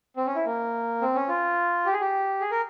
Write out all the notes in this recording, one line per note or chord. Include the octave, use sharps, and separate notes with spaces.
C4
C#4
E4
A#3
C4
C#4
F4
G4
G#4
G4
G#4
A#4